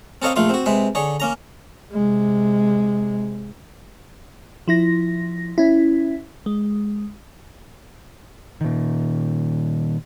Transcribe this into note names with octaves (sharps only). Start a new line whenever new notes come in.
C4 A4 A#4 C#5 D#5 F5
A#1 A3 F4 C6
C4 F#4
C3 G#3 B4 C5
D3 G#4 C#5
A#3 C#4 A#5
C3 G#3
F3 E4 A#6
C#4 E4
G#3
A#2 D#3